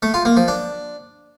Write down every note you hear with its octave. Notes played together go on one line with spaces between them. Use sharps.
A3
F4
A#3
F3
D4